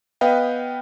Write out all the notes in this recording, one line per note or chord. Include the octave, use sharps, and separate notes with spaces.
B3 B4 D#5 F5 G5